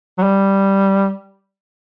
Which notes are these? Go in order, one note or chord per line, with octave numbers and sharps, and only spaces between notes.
F#3
G3